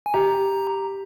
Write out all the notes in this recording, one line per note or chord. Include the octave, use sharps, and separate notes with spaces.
G#5
G4 A#5